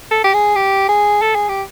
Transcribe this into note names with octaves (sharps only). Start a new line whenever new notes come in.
A4
G4
G#4
G4
G#4
A4
G#4
G4